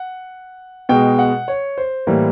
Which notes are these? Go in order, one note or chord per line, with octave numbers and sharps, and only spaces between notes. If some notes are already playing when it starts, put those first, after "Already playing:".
Already playing: F#5
B2 G#3 G5
F#5
C#5
C5
A2 E3 G3 A#3